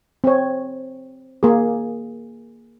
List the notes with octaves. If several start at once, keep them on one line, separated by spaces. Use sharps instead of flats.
C4 C#5
A#3 G#4